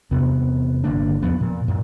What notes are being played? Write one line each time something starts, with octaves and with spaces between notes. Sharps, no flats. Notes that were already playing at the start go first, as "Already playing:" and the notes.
E2 C3 B3
G1 D3 A#3 D4
E2 F3 B3
A#2
F#2 A#2